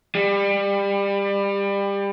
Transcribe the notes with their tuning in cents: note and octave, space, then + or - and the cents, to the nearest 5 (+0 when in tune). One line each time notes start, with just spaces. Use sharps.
G3 +25